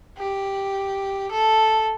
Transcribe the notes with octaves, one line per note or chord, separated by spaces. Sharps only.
G4
A4